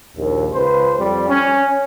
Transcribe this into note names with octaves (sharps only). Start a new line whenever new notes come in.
A#1 D#2
C#2 B4 C5
F2 G3
C#4